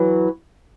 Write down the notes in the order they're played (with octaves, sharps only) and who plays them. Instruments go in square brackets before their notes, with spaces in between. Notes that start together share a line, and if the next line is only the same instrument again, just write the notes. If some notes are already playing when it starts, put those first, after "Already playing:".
Already playing: [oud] E3 F#3